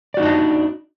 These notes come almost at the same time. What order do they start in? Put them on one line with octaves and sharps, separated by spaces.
D5 F#4 D#4 D4 D#5